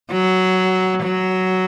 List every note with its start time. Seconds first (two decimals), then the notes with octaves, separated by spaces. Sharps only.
0.12 F#3
1.03 F#3